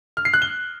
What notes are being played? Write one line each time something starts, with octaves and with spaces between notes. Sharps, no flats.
F6
C7
F#6
G7